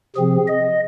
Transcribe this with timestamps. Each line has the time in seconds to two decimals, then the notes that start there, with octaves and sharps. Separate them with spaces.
0.16 C3 F3 C4 G#4
0.47 D#5